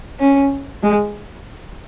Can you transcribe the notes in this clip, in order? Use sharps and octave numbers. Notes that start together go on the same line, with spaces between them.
C#4
G#3